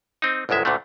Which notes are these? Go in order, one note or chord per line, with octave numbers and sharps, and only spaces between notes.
C4 D#4
G1 C2 F#2 G#3 E5
D2 A#2 D3 A3